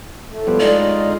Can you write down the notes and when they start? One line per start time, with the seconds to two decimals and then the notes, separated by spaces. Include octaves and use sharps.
0.29 A2 A3
0.47 F3 G3 B3
0.60 G#3 D#4 F4 D5
0.80 C#4
1.01 D3